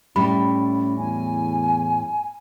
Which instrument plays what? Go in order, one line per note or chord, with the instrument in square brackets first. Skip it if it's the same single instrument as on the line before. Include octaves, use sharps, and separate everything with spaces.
[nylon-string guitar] A2 G3 [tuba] C#4 [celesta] B5
[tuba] E2 [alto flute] G#5